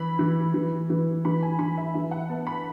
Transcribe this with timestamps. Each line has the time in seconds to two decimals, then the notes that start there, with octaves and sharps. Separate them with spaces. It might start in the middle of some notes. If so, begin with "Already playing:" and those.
Already playing: E3 B5
0.19 E3
0.54 E3
0.90 E3
1.25 E3 B5
1.43 G#5
1.59 E3 B5
1.78 E5
1.94 E3 E5
2.11 F#5
2.29 B3 A5
2.47 B5